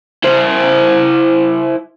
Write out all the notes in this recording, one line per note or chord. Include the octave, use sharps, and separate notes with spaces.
E4 C5